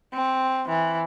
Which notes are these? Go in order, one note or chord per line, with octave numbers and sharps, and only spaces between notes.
C4
E3